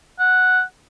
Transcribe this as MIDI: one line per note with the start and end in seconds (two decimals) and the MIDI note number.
0.19 0.61 78